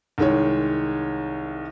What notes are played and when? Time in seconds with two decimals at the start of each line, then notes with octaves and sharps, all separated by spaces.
0.18 C2 D#3 G#3 C#5